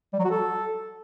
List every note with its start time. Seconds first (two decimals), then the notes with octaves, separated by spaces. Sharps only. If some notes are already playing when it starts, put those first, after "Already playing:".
0.13 G3
0.19 F#3
0.25 F#4
0.31 A4